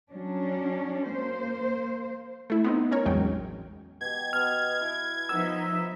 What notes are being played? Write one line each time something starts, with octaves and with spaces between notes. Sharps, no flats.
F#3 C#4 D4
A#3 C5
A3 E4
B3 C4 D#4
C#4 A#4 C#5
A1 E2 F#3 G#3 G5
B2 G4 G#6
B2 B3 D#5 F6
E4
F3 B3 D#4 A#4 E5 E6